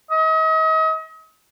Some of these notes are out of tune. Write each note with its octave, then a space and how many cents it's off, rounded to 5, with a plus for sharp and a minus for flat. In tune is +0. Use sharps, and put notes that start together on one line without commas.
D#5 +40